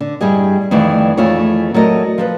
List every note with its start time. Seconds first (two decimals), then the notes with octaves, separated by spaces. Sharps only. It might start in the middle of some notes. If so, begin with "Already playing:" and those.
0.01 D3
0.21 G2 G3 E4 G#4 D#5
0.71 F2 D#3 E3 A3 D5
1.17 F2 E3 A3 F4 G#4 C#5
1.74 F#3 A3 A4 A#4 D5 D#5
2.18 F3 A4 B4